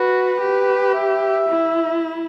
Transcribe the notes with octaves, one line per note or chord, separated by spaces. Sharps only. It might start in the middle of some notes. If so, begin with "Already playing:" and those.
Already playing: F#4 B4
G4
E5
E4